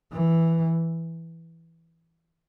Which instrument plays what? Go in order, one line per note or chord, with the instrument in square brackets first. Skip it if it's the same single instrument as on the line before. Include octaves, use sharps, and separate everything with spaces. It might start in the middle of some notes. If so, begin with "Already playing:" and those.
[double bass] E3